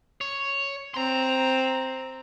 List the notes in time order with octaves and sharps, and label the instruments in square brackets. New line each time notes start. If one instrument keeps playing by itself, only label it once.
[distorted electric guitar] C#5
[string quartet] C4 [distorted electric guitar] A#5 C6